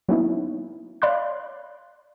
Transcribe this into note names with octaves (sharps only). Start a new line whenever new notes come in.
F#3 A#3 B3 C#4 D#4 E4
C#5 D5 F5 B5 C6 F#6